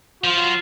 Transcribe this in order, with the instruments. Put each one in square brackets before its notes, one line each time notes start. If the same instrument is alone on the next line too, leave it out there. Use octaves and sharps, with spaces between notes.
[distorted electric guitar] F3 [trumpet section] F4
[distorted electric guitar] F#3